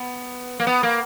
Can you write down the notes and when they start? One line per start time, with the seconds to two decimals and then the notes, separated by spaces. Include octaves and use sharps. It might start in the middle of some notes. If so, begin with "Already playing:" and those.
Already playing: B3
0.60 A#3
0.67 B3
0.83 A#3